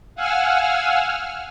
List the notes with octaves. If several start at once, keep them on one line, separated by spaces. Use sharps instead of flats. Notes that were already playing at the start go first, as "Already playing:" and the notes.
F5 F#5 G#5 E6 F6